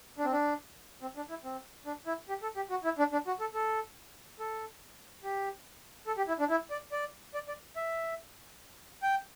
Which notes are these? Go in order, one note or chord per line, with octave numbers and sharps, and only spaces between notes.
D4
C4
D4
C4
D4
E4
C4
D4
E4
G4
A4
G4
F#4
E4
D4
D4
F#4
A4
A4
A4
G4
A4
G4
E4
D4
E4
D5
D5
D5
D5
E5
G5